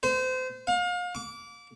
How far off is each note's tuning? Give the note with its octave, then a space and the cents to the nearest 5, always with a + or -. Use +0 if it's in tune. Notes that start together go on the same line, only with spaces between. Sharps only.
C5 -30
F5 +35
D6 -25